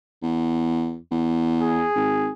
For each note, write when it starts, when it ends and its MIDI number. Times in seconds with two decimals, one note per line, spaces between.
0.23 0.97 40
1.11 1.85 40
1.61 2.33 68
1.95 2.28 32